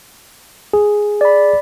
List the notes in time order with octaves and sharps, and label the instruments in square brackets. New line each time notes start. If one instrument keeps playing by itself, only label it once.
[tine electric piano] G#4
[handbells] D5 B5